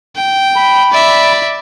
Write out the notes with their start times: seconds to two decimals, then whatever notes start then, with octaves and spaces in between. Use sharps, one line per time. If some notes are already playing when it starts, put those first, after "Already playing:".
0.16 G5
0.56 B5
0.92 D5 E5